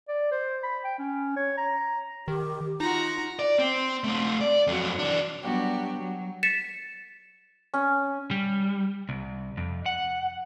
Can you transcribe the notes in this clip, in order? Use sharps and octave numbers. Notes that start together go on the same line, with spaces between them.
D5
C5
B5
G5
C#4
C#5
A#5
D#3 G4
D#4 F4 F#4 A#5
D5
C4
A3 C4
D5
F2 F#3
E3 D4
F#3 G3 B3 D4 F#4 G4
F#3
A6 B6 C#7 E7
C#4
G3
C2
F2
F#5